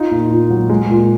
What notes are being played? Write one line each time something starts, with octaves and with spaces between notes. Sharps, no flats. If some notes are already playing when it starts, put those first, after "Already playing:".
Already playing: D#4 F4
A#2
A#2
F#3
G#3
A#2